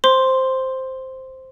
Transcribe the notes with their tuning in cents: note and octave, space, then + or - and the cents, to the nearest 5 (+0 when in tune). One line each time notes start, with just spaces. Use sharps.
C5 +0 C6 +0